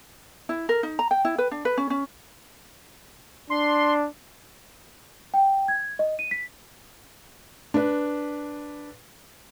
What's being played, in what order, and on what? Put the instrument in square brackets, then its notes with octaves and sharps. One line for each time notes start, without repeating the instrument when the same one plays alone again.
[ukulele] E4
A#4
D#4
A#5
G5
E4
B4
D4
B4
C#4
C#4
[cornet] D4 [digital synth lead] C6
[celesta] G5
G#6
D#5
D#7
B6
[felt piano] D4 B4